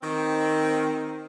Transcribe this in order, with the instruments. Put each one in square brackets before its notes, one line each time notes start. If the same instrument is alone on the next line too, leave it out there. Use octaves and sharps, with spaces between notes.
[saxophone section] D#3 C4